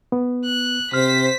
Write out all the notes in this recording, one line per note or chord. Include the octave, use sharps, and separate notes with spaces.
B3
F#6
C3 C5 F6 B6